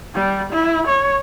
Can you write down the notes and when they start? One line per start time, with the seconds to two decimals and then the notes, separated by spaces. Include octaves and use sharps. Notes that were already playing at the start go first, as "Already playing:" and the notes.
0.14 G3
0.52 E4
0.87 C#5